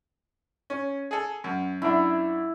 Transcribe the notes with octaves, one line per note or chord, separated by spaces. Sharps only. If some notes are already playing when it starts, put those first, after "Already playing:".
C#4
G#4 A4
F#2
F#2 D4 E4